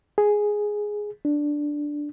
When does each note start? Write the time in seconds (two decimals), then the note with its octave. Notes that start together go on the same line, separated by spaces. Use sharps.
0.18 G#4
1.25 D4